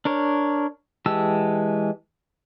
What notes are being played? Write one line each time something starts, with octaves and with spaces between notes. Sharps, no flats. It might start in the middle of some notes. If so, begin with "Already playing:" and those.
D4 A#4 C#5
E3 G#3 G4 A5 E6